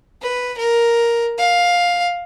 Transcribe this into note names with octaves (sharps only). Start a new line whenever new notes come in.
B4
A#4
F5